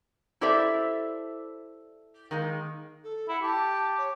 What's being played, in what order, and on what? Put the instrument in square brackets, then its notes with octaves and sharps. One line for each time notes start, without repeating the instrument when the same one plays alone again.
[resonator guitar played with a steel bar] E4 G4 A4 C5 D5 E5
D#3 G#3 A#3
[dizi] A4
[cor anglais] E4 [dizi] F#5
[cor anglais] G4 [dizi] A5
[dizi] C#5